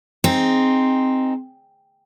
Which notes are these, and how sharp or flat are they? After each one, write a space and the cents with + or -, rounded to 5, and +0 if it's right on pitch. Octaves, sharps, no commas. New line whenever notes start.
C4 +0 D#4 +0 G#4 +0